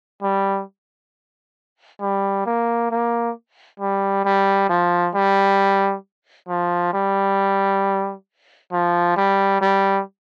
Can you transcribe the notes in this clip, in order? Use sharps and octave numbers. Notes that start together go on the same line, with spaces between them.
G3
G3
A#3
A#3
G3
G3
F3
G3
F3
G3
F3
G3
G3